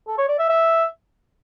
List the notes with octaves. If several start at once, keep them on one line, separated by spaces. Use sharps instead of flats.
A4
C#5
D5
E5
E5